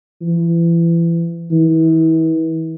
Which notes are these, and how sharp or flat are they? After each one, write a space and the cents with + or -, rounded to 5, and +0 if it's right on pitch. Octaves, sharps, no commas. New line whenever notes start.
E3 +30
E3 -35